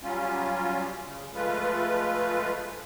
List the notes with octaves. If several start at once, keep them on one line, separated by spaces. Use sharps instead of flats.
F#3 G3 C#4 F4
C#3
F3 G#3 A3 F4 B4